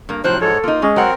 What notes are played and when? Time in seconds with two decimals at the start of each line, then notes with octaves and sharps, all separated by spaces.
0.09 G2 A#3
0.24 A2 C3 F3 F#3 C5 F#6
0.41 G#2 G#3 A4 C#5
0.64 A#3 D#4 F4
0.82 G#3 C#4
0.96 F#3 C4 A#4 F#5